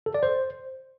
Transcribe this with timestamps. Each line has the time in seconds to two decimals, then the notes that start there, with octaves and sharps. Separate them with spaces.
0.06 A4
0.14 D5
0.23 C5